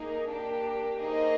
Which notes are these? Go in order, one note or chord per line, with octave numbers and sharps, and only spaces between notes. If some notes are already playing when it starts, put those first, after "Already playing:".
Already playing: A#3 D#4 G#4
A#3 D4 G4
A#3 D#4 G#4 C5 D#5